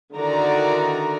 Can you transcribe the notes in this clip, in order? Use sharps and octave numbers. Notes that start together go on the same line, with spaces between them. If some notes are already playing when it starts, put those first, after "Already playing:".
D3 D#3 E4 F#4 D5 A#5